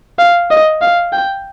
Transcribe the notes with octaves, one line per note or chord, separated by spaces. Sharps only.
F5
D#5
F5
G5